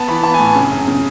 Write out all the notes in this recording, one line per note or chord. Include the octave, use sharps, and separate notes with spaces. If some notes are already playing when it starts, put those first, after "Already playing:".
Already playing: B3 A5
E3 B5
B3 A5
G#5
A2
C#3
F#2
C#3